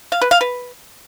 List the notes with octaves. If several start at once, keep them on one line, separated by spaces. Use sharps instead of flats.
F5
B4
F5
B4